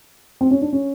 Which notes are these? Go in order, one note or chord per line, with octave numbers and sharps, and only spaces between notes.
C4
C#4
D4
C#4